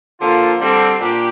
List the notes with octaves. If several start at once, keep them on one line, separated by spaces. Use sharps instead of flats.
D3 F3 A#3 F4
D3 G3 C4
A#2 D4 G4